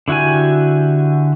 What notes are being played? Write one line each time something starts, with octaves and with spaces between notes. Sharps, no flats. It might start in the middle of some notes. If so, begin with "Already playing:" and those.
D3 E4 F#4 G4 G#5